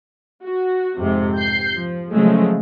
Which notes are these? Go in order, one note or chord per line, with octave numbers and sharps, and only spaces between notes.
F#4
F2 G#2 C3
G6 C7
F3
C#3 F3 F#3 G#3 A3